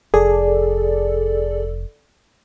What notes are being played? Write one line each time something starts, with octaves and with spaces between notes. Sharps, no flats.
F1 G#4 A4 D5